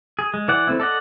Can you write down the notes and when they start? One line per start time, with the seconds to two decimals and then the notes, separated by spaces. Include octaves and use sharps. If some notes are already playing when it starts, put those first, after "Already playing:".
0.19 G#4
0.34 G#3
0.48 E3 D5 F#5
0.67 A3 C4 E4
0.80 A4 D5 D#5 F#5